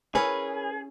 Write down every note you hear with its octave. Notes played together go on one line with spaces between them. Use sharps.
C#4 E4 G#4 A#4 B4 C#5